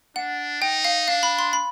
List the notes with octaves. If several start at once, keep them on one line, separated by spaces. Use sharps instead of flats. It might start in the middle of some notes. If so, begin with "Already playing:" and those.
D4 F#5
D#4 G5
F5
D4 F5
B5
C6
B5